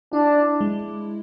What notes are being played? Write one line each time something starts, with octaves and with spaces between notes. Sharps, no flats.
D4 E4
G#3